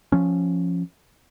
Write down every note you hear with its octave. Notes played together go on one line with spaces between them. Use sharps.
F3 C#4